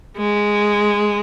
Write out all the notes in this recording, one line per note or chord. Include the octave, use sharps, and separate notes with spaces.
G#3